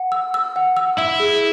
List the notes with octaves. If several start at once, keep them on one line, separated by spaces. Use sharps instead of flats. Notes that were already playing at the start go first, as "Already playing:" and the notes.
Already playing: F#5
E6
E6
F#5
E6
E4 E6
G#4